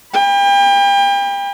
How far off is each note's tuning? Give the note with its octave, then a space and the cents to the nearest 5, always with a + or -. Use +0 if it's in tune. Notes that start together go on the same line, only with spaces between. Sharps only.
G5 +35 B5 -20